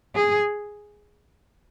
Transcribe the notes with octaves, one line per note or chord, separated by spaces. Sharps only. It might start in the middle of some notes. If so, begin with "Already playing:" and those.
G#4